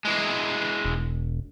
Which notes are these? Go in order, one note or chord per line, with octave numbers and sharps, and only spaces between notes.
E3 G#3
E1